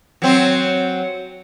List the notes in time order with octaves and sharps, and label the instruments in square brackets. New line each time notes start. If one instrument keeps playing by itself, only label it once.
[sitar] F#3 C4